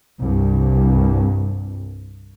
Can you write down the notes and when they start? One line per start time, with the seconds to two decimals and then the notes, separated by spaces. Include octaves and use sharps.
0.19 C2 G2